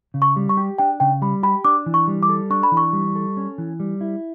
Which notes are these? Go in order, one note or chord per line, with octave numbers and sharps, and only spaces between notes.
C#3
C#6
G3
C#6
G4
D4 G5
C#3 G5
G3 B5
G4 B5
D4 D6
E3
C#6
G3
D6
A4
D4 C#6
B5
E3
C#6
G3
A4
C#4
E3
G3
E4